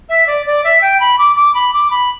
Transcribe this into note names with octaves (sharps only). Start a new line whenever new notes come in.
E5
D5
D5
E5
G5
B5
D6
D6
B5
D6
B5